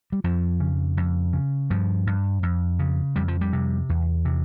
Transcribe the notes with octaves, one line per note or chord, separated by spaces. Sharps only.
G3
F2 F3
C#3
F2
C#3
G2 F3
G2
F2
C#3
F2 G3
F3
G3
C3
E2
C3